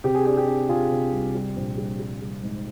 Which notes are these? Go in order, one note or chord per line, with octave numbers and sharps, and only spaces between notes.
C3 G4
G#4
D4 G4
G4
D4
C3 F4 G#4
C3
C2
G3
A#1
G3
G3
G3
G#2